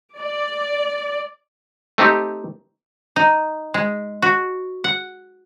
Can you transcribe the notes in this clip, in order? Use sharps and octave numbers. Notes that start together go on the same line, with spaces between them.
D5
A3 C4 D#4 G4
D#4
G#3
F#4
F#5